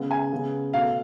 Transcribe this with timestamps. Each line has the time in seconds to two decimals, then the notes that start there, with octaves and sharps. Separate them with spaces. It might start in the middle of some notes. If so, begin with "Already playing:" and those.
Already playing: C#3 G#3 B3
0.11 G#5
0.32 C#3 G#3 B3
0.73 B2 A3 F5